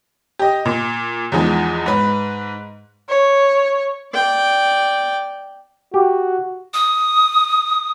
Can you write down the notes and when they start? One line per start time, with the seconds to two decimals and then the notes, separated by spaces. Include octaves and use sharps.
0.39 G4 D#5
0.65 A#2
1.32 E2 F3 G#3 D#4
1.86 G#2 B4
3.09 C#5
4.14 D5 G5
5.94 F#4 G4
6.74 D#6